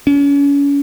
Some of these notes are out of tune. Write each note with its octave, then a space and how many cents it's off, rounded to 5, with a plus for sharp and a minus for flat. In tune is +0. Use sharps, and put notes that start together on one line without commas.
C#4 +35